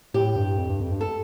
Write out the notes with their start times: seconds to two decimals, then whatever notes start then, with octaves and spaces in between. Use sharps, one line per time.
0.14 A2 G4
0.36 G2
0.57 F2
0.69 G2
0.80 F2
0.91 G2
1.01 A4